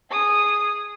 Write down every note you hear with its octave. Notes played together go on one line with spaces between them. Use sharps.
G#4 D#6